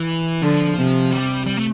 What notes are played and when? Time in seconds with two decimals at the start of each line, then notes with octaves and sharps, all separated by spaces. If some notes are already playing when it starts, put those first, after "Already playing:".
Already playing: E3
0.42 D3 F3
0.77 C3
1.12 G3
1.46 G3
1.57 A3